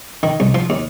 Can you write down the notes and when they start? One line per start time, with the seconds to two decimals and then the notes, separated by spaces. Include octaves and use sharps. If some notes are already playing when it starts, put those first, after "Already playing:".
0.23 D#3
0.40 C2
0.54 F3
0.70 D#2